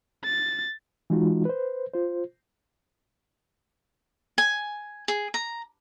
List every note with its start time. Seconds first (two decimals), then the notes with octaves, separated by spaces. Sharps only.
0.25 A6
1.10 E3 G#3 D#4 F4 F#4
1.45 B4 C5
1.94 F4 C5
4.38 G#5
5.08 G#4
5.34 A#5